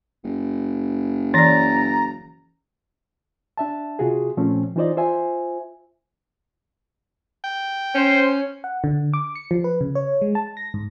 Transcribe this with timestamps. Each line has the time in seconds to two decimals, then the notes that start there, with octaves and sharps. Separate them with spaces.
0.24 F#1
1.34 E3 D5 A#5 A6 A#6
3.58 D4 E5 A5
3.99 C3 F4 F#4 G#4
4.37 A#2 F3 A3 C4 C#4
4.76 E3 D#4 F4 C5 D5 D#5
4.97 F4 C5 E5 G#5
7.44 G5
7.95 C#4 C5
8.64 F#5
8.84 D3
9.14 D6
9.35 C#7
9.51 F3
9.64 B4
9.81 C#3
9.95 C#5
10.22 G#3
10.35 A5
10.57 A#6
10.74 G#2